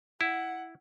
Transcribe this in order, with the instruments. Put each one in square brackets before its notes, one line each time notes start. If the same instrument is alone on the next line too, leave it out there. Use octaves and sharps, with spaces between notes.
[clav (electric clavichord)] E4 [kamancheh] F#5